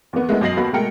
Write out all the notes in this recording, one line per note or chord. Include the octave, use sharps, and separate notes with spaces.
E2 B3
G#3 A3 B3 E4
F#2 B2 D#5 A#6 C7 F#7
D#2 B3 F#4 B5
B2 G#3 A3 A#4 G5 C#7